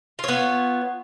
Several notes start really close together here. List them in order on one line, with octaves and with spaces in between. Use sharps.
F4 C#5 B3